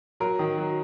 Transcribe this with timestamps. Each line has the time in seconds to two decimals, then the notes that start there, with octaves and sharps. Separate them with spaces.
0.20 F#3 A#4
0.39 D#3
0.58 F#3